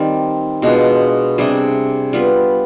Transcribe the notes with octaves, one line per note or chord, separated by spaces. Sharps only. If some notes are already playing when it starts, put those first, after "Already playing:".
Already playing: D#3 G3 C4
B2 G#3 D4 F4
C3 G3 D4 G#4
G3 B3 F4 B4